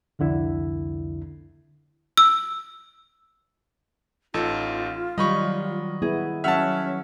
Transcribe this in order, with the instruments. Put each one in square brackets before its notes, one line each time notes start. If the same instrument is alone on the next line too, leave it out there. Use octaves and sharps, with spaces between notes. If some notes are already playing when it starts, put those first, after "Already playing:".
[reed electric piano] C2 F2 D3 E4
[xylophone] E6
[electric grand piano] A1 D#4 A4 [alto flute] F4
[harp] D#3 F#3 [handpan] G3 [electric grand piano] D#5 B5 C#6
[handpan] B3 E4 [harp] G#4
[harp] F#3 F#5 F6 [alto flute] C#4 [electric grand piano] E5 A5